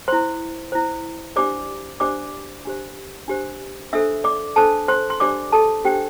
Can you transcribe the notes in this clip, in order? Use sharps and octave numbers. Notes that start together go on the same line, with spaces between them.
E4 C5 C6
E4 C5
D4 G4 C5 D5 D6
D4 G4 C5 D5 D6
D4 G4 C5
D4 G4 C5
D4 A4 C5 E5 E6
D5 D6
D4 A4 C5 A5
C5 C6
C6
D4 G4 C5 D5 D6
A4 A5
D4 G4 C5 G5